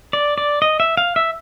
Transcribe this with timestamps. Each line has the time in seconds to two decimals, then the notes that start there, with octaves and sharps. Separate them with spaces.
0.13 D5
0.38 D5
0.62 D#5
0.80 E5
0.97 F5
1.16 E5